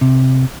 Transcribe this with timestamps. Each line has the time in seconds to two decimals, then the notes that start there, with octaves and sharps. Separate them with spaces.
0.01 C3